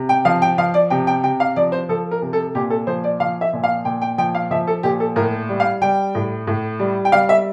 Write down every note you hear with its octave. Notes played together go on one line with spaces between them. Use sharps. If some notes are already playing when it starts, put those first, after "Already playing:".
Already playing: C3
G5
F3 F5
G5
F3 F5
D5
C3 G5
G5
C3 G5
F5
F3 D5
C5
F3 A4
A#4
C3
A4
A#2 G4
A4
F3 C5
D5
F3 F5
E5
A#2
F5
A#2 G5
G5
F3 G5
F5
F3 E5
A4
A#2 G4
A4
A2 A#4
G3
F5
G3 G5
A2
A2
G3
G5
G3 F5
E5